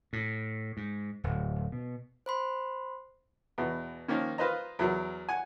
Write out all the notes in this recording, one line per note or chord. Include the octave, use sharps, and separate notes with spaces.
A2
G#2
D1
B2
C5 B5 C6
E2 B2
D#3 F3 A#3 C#4
F4 B4 C5 D#5 A#5
E2 F#3 A#4
F#5 G#5